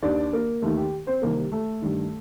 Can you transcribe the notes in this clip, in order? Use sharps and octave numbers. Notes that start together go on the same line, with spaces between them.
D#2 D#3 D4 D5
A#3 A#4
D#2 D#3 A3 A4
G4
C4 C5
C2 C3 D#3 A#3 A#4
A3 A4
G2 D#3